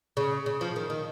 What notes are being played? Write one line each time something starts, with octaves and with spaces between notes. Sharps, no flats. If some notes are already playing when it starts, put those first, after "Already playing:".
C#3
C#3
F3
D#3
D#3